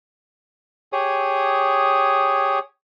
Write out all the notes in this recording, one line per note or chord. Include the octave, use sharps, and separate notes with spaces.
G4 G#4 C#5 D#6